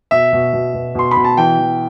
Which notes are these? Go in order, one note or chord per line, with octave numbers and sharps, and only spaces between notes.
B2 E5
B2
B2
B2
B2 C6
B5
B2
A5
E3 G5
E3